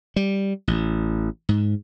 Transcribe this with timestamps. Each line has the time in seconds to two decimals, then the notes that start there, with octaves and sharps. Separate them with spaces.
0.16 G3
0.68 A1
1.49 G#2